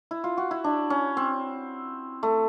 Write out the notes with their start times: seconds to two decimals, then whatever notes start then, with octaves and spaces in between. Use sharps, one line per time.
0.11 E4
0.24 F4
0.37 F#4
0.51 E4
0.64 D4
0.90 C#4
1.17 C4
2.23 A3